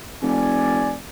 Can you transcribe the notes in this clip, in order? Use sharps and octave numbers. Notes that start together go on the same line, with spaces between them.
F1 D5 G#5